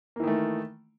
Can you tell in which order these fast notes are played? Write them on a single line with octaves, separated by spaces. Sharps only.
A#3 E3 D#3 A3